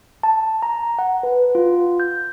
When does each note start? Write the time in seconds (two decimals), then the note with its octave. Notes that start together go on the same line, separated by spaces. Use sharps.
0.23 A5
0.62 A#5
0.99 F#5
1.23 B4
1.55 F4
2.00 G6